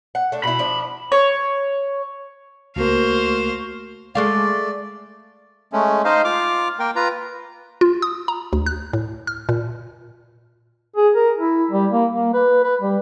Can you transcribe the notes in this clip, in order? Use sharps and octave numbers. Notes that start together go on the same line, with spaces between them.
F#5
A3 D4
B2 E4 B5
F3 D4
C#5
C#2 A3 A#3 F#4 A#4 C5 F5
G#3 A3 D5 F5
G#3 A3 C#4
D#4 C5 D#5 F5
F4 D6 F6
A#3 A#4 G5
F4 B4 A#5
F4
D#6
A#5
D2
F#6
A2
F6
A#2
G#4
A#4
E4
G3
A#3
A#3
B4
B4
G3